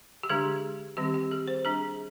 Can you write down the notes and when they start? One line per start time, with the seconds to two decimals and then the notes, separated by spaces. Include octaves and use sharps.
0.23 G4
0.29 D3 G#3 D4 G#4
0.97 D#3 G3 C4 G4
1.14 G4
1.31 G#4
1.48 C5
1.65 G3 D4 G#4